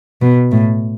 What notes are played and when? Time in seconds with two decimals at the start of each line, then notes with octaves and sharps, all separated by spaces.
0.22 B2
0.52 A2